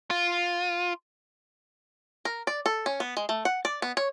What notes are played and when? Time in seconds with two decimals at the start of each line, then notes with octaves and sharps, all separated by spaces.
0.11 F4
2.25 A#4
2.47 D5
2.66 A4
2.86 C#4
3.00 B3
3.17 G#3
3.29 A3
3.45 F#5
3.65 D5
3.82 B3
3.97 C#5